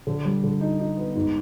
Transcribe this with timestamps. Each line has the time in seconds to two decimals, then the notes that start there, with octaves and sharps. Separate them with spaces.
0.07 D3
0.25 G3
0.43 D3
0.61 D#4
0.80 D#4
0.97 B3
1.15 G#2